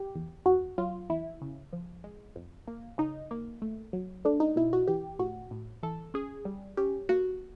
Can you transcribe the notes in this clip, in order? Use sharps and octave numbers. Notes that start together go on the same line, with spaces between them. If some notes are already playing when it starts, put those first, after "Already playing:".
Already playing: G4
E2
E2 F#4
F#3 F4
E2 E4
C#3
F3
G#3
F2
A#3
C#3 D#4
A#3
A3
F#3
A3 D4
D#4
B2 E4
F#4
E3 G4
A2 F#4
A2
E3 A4
C#4 G#4
G3
C#4 G4
A#3 F#4